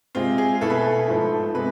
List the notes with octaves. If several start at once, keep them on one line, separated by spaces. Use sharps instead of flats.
C3 G#3 C4 F4
G#4
B2 A3 E4 A4
B4
A4
G#2 F3 A3 E4
C3 G#3 B3 B4